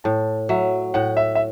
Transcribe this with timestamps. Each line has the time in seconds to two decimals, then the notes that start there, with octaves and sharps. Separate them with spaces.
0.04 A2 A5
0.49 F#3 E5
0.94 A2 F#5
1.17 E5
1.35 E5